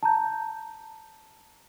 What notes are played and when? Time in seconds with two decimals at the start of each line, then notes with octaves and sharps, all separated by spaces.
0.03 A5 A#5 G6